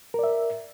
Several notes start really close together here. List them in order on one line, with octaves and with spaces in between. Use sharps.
A#4 D5 E5